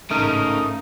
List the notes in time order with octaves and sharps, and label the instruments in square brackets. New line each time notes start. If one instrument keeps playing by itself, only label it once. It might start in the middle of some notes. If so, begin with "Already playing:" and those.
[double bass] A1 G#2 [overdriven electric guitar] C#3 [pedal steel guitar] A3 A#4 [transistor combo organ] D#4